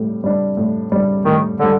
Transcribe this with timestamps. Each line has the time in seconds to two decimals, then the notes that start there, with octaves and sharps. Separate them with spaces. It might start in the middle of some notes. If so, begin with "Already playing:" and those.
Already playing: A2 G3
0.24 G3 D4
0.57 A2
0.92 G3 D4
1.25 A2 D#3
1.60 D3 G3 D4